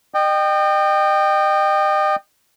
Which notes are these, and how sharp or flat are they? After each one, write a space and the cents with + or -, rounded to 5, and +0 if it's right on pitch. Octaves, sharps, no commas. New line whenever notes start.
D#5 -35 G5 +0